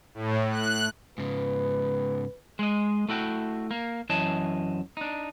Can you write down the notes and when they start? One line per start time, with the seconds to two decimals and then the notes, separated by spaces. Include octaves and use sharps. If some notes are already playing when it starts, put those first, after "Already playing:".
0.14 A2
0.50 F#6
1.18 G#2 C#3 B4
2.59 G#3 D#5
3.09 A3 E4 F#4 G5
3.71 A#3
4.10 F#2 E3 C#5 D#5 A5
4.97 D4 D#4